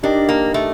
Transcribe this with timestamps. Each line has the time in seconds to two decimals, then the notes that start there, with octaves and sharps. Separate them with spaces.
0.03 D4 D#4 G4 A#4 D#5 G5
0.29 A#3
0.54 A3